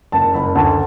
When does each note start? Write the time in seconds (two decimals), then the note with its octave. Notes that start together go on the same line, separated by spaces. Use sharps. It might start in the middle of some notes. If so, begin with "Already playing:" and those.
0.12 F#1 A5
0.34 F#1 B5
0.55 D2 A5